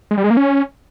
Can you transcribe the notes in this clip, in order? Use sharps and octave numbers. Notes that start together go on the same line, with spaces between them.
G#3
G3
G#3
A#3
C#4